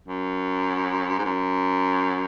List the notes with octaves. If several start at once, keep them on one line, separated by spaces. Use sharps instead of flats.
F#2
G#2
F#2